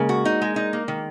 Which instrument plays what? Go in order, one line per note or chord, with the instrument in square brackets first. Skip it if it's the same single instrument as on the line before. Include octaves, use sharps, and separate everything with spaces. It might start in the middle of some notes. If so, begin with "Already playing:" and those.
Already playing: [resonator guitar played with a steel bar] C#3 [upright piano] G#3 A#3
[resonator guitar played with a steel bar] F#4
D#4
G#3
D#4
A#3
D#3